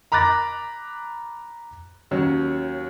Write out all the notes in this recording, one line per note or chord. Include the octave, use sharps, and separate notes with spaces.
A#5 B5 D6 F#6 A6 A#6
D#2 F#3 C#4